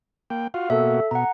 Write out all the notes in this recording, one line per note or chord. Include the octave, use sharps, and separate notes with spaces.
A#3 G5
F4 F#4 F5
B2 A#3 F#4 A4 E5
B2 F#5 A#5